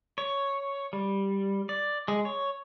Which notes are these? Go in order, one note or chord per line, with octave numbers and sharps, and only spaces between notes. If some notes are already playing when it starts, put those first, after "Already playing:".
C#5
G3
D5
G#3
C#5